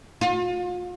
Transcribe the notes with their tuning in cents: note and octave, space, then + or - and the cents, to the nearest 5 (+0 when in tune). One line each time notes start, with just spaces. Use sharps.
F4 +40